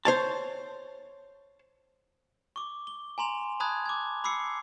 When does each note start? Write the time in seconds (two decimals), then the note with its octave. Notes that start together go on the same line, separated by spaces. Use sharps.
0.05 C5 C#5 A5
2.56 C#6 D6
2.87 G7
3.18 G#5 A#5 C6 F7
3.60 A5 B5 D#6 F#6 G#6
3.86 D6 G#6
4.24 B5 D6 E6 C7 C#7